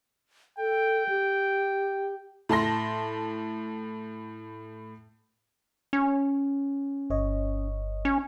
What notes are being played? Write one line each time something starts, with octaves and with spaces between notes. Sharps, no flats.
A4 G5
G4
A2 A5 C6 A#6
C#4
G1 C#5 D#5
C#4